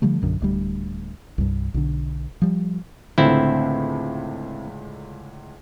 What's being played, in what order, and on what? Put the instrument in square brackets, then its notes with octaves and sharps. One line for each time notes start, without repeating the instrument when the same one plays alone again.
[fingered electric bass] D3 F3 G3 A3
A#1 F#2 D3
D1 D2 G3
C2 G2
B1 D3
F3 G3
[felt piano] C#2 A2 D3 [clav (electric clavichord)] C4 E4